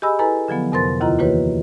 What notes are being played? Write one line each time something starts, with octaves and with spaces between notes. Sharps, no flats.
G4 G#4 D#5 G#5 B5 E6
E4 A4 B4 G#5 A#5
D3 F3 F#3 B3
F2 C3 A#4 C5 C6 A6
D#2 D#3 E4 F4 D#5 A#5
E3 A#3 F#4 G4 B4 C#5